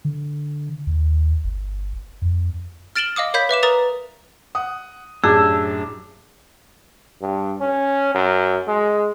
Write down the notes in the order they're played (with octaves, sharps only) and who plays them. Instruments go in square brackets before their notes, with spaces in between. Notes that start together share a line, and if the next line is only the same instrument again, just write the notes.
[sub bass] D3
D#2
G1
F2
[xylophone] F6 A6 D7 E7 F#7 G7
D#5 F5 D6 D#6
A#4 C#5 F5 B5 G6 B6
B4 E5 D6 E7
A#4 B4 A#5 D#6 A6 F7
[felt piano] F#5 D#6
[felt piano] F#2 A2 [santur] D4 G4 [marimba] G#4 [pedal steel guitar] E6
[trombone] G2
C#4
F#2
G#3